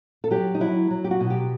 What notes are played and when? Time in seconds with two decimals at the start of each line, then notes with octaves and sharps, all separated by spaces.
0.24 A4
0.31 F#3 G4
0.54 D#4
0.60 F#3 E4
0.91 F#3
1.04 G4
1.11 F#4
1.20 B2
1.30 G4